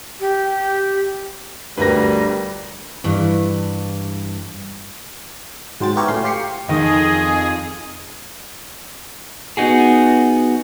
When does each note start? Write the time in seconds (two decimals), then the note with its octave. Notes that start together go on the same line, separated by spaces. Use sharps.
0.20 G4
1.78 G1 D2 G3 A#4 B4 A#6
3.04 G2 E3
5.80 G#2 F#3 C5 G5 A6
5.96 B3 E4 G4 A#4 C#5
6.08 A2 C#4 C6
6.24 F4 G4 C7 C#7
6.69 F2 D#3 G#4 D#5
9.57 B3 D#4 F#4 G#4